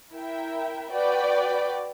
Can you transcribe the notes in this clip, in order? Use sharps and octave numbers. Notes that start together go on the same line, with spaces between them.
E4 A#4 E5 G5
F#4 B4 D5 G5